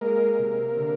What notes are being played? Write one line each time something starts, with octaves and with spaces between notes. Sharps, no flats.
G#3 A#3 A#4
C3
D3